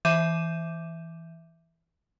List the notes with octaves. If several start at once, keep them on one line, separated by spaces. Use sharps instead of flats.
E3 E5 D6 G6 D#7 E7